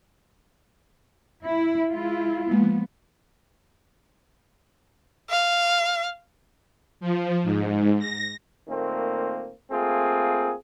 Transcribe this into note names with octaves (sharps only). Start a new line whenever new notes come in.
E4
G#3 E4 F4
F3 G#3 A#3 B3
F5
F3
G#2
A#6
A#2 D#3 A3 A#3 C4
A3 A#3 C4 F4 G#4